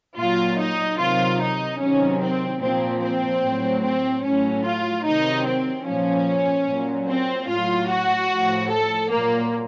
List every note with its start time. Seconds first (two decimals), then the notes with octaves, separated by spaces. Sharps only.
0.17 A#2 F#3 F4
0.58 D#4
0.99 C3 D#3 F#3 F4
1.40 D#4
1.80 C3 D#3 F#3 C#4
2.20 C4
2.61 A#2 F3 C4
3.01 C4
3.42 A2 F#3
3.83 C4
4.23 A2 F#3 C#4
4.64 F4
5.04 C3 D#3 F#3 D#4
5.45 C4
5.85 A#2 F3 C#4
6.66 A#2 F#3
7.08 C4
7.48 A2 F#3 F4
7.88 F#4
8.29 A2 F3
8.69 A4
9.10 A#2 F#3 A#3